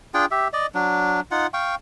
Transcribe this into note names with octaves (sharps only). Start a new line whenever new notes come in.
D4 F4 G#4 G5
G4 E5
D5 D#5
F#3 D4
D#4 F4 F#5
F5 G5 C#6